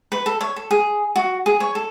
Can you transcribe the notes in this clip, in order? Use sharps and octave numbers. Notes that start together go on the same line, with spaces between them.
B4
A4
C#5
A4
G#4
F#4
G#4
C#5
A4